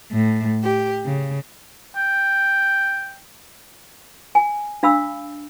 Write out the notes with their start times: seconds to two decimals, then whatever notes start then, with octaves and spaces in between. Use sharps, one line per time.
0.11 A2
0.63 G4
1.05 C#3
1.96 G5
4.35 G#5
4.83 D4 F5 B5 E6